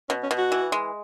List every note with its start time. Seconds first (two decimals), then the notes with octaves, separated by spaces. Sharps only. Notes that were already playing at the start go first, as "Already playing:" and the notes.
0.09 B2 C#4
0.23 C#4
0.31 B2
0.38 F#4
0.52 E3
0.72 G#3